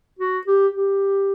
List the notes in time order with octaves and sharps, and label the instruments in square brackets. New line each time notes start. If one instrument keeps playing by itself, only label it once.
[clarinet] F#4
G4
G4